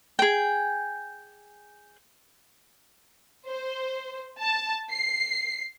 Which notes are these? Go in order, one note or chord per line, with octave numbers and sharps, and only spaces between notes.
G#4 G5
C5
A5
C7